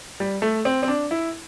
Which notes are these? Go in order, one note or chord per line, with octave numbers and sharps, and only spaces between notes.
G3
A3
C4
C4
D4
E4